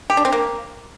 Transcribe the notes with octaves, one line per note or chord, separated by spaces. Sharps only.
G4
D4
C4
A#3